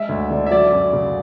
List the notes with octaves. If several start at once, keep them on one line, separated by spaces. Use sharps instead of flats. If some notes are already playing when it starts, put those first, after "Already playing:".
Already playing: G#3 E5
D2
D3
E5
F#3 D5
F#2
C#3